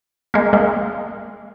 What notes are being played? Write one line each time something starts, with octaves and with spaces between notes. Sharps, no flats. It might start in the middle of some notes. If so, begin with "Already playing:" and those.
G#3 A#3
G#3 A#3